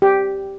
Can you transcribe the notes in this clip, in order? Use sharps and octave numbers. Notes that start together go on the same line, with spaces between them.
G4